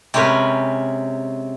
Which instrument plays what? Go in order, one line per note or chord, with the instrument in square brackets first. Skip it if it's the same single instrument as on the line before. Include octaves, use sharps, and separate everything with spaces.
[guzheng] C3 G#3 C#4 A#4 B4